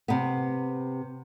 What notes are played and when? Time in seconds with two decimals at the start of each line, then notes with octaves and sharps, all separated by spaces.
0.08 C3 B3